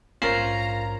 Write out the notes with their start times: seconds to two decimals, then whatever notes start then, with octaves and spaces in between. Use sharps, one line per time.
0.22 A#1 G#2 C#4 F4 A#4 C5 A#5 C7